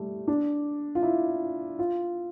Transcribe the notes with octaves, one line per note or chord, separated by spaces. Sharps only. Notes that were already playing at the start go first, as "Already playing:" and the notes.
Already playing: G3 A3
D4
F4
E4
F4